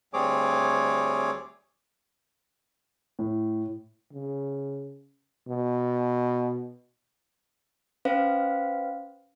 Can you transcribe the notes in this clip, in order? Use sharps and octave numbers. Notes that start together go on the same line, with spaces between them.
D2 G3 C4 G#4 C#5 D6
A2
C#3
B2
C#4 B4 C5 F5